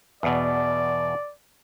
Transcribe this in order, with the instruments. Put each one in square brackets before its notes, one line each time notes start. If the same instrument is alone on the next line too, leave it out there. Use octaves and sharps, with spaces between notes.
[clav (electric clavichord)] E2 B2 [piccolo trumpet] D5